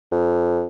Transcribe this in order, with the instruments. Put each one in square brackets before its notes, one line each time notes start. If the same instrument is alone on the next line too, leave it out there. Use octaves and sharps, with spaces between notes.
[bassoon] F2